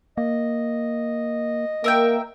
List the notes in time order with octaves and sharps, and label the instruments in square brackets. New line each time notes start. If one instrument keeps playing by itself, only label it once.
[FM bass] A#3 [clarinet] D#5
[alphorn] A#3 [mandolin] A#4 E5 G5